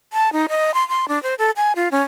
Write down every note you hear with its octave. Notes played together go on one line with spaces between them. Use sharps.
A5
D#4
D#5
C6
C6
D4
C5
A4
G#5
F4
C#4